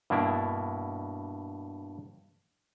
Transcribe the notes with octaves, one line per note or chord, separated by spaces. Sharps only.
G2 B2 A#3 D4 E4